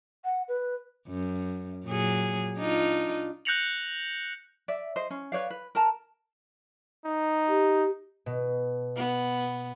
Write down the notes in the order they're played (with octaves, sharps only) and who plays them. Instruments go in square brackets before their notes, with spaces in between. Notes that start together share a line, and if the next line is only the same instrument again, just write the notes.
[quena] F#5
B4
[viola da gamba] F#2
A#2 F#3 G#4
D4 D#4 F4
[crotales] F#6 G6 A#6 C#7 F7 F#7
[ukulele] D5 E5
C5 D#5
C#4
B4 C#5 D5 F5
B4
A#4 A5 A#5
[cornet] D#4
[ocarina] G4
[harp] B2
[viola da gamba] B3